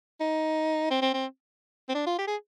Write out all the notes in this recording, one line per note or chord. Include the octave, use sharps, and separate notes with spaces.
D#4
C4
C4
C4
C4
D4
F4
G4
G#4